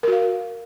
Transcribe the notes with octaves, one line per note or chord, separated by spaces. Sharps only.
F#4 A#4 F5